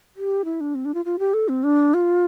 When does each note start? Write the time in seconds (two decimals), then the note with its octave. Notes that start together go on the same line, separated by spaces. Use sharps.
0.16 G4
0.45 E4
0.61 D4
0.75 C4
0.85 D4
0.94 F4
1.05 F4
1.19 G4
1.34 A4
1.49 C4
1.64 D4
1.94 F4